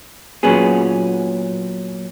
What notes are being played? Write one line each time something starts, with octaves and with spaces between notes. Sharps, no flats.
A#2 F#3 B3 C#4 G#4